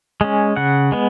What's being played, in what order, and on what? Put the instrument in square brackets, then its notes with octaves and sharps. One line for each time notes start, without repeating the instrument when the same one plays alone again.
[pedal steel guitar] G#3 C#4
C#3 F#5
G#3 B3